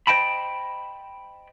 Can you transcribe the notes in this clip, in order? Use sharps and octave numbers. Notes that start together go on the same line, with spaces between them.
C5 D#5 G5 A5 B5